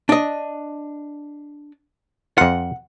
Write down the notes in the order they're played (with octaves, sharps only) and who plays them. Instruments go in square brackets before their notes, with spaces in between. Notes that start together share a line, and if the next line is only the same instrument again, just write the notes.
[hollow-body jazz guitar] D4 D#5
[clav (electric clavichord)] F2 F4 [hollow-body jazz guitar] F#5